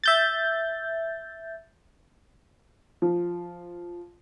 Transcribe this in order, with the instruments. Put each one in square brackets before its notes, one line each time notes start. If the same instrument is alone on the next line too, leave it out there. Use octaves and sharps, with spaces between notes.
[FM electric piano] E5 G6 A6
[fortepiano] F3